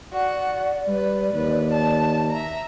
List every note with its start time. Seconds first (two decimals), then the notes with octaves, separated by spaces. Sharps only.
0.12 F#4 D5 F#5
0.88 G3 B4
1.34 D#2 B4
1.73 A5
2.31 E5 A#5